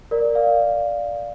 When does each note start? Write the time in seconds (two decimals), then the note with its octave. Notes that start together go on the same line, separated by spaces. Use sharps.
0.11 A#4 D5
0.35 D5 F5